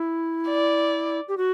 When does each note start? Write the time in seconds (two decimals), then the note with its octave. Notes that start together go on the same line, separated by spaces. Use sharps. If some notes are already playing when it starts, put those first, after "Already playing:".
Already playing: E4
0.48 D5
1.28 G4
1.38 F#4